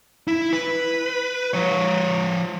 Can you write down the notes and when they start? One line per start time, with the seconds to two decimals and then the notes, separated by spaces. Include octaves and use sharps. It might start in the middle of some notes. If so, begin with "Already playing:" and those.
0.28 E4
0.53 B4
1.53 F3 C#5